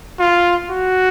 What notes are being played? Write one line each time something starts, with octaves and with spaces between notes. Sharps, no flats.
F4
F#4